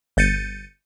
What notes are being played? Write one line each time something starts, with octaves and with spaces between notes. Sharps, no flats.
G1 G6 A6 C#7 D#7